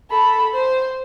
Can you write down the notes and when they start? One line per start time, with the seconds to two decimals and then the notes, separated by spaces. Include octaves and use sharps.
0.11 A4 B5
0.54 C5